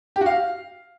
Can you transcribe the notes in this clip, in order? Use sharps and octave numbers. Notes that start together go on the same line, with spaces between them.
G4
F#4
F5